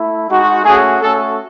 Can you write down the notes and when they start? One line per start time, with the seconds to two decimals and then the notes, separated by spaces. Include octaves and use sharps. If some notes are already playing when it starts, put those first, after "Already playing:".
Already playing: A3 E4
0.28 G#3 D#4 F#4
0.64 A3 C#4 F#4 G#4
1.01 A3 C#4 F#4 A4